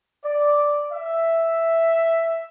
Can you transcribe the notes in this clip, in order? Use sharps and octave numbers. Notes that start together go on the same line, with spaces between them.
D5
E5